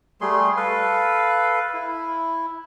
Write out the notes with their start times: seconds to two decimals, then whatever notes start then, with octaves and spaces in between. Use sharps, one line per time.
0.21 G3 A3 G#4 C6
0.57 A4 B4 F5
1.74 E4